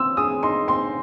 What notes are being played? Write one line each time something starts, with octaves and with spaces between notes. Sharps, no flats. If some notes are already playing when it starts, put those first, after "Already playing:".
Already playing: C4 E6
G#4 D#6
D#4 C6
C4 C6